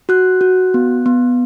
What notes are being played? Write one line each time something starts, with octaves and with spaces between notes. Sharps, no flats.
F#4 F#6
F#4
B3
B3